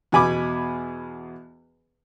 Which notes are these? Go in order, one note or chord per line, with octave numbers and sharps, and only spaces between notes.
E2 B2 G#5 B5 D6